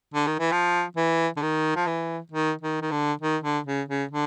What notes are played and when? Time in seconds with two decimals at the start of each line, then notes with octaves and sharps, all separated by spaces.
0.14 D3
0.27 D#3
0.39 E3
0.52 F3
0.97 E3
1.37 D3
1.42 D#3
1.76 F3
1.87 E3
2.32 D#3
2.62 D#3
2.82 D#3
2.91 D3
3.21 D#3
3.43 D3
3.66 C#3
3.88 C#3
4.11 D3